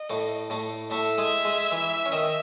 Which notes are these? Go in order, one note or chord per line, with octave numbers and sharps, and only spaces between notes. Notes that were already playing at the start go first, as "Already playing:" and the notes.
Already playing: D#5
A2 A3
A2 A3
A2 A3 E5
G#3 G#4
G#3 G#4
E3 E4
C#4
D#3 D#4